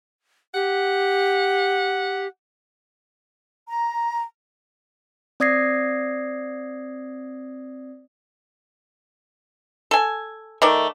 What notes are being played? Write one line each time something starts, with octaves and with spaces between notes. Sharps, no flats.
G4 F#5
A#5
C4 D5 D#6 G#6 A#6 C7
A4 G#5
D#3 A3 D5